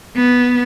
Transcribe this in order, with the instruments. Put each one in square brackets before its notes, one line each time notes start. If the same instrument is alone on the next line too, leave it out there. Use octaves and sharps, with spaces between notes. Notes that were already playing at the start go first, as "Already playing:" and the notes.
[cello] B3